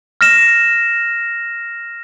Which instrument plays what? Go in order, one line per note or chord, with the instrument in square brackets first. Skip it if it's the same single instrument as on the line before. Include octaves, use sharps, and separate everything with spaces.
[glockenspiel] F6 A#6 E7